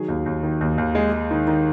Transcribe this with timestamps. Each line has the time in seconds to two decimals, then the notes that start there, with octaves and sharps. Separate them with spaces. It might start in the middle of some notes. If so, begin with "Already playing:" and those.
Already playing: D#3 F#3 G#4
0.08 D#2
0.26 D#2
0.43 D#3
0.61 D#2
0.78 D#2
0.95 G#3
1.12 G#3
1.31 D#3
1.47 D#3